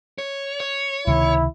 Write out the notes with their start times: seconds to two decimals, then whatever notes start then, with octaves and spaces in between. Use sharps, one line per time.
0.18 C#5
0.60 C#5
1.07 C#2 C3 D#3 E4